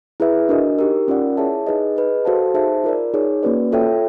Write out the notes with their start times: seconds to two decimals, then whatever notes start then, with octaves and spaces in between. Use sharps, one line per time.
0.20 E4 G#4 B4 E5
0.49 D4 F#4 A#4 D#5
0.79 D#4 G4 A#4
1.08 C#4 F4 A#4 D5 F#5
1.37 E4 G#4 C#5 E5 A5
1.67 D#4 G#4 B4 D#5
1.96 G#4 B4 D#5
2.25 F#4 A4 C5 F5 A5
2.54 D#4 G#4 C5 E5 A5
2.84 F4 A#4 D5
3.14 D#4 G#4 C#5
3.43 A#3 C#4 F#4 B4 D5
3.72 F4 A4 C#5 E5 G5